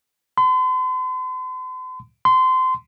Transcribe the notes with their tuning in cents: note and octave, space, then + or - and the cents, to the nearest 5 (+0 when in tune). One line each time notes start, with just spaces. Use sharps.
C6 -45
C6 -25